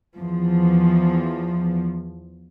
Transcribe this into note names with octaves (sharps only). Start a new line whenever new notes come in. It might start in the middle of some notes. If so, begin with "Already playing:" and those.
E2 F3